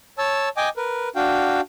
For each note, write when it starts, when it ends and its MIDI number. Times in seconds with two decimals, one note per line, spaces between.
0.18 0.49 73
0.18 0.49 81
0.18 0.49 88
0.57 0.69 75
0.57 0.69 79
0.57 0.69 80
0.57 0.69 86
0.77 1.09 70
0.77 1.09 71
1.15 1.61 62
1.15 1.61 66
1.15 1.61 77
1.15 1.61 79